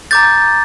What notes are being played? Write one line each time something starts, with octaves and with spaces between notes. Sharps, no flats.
A#5 D6 G6 A6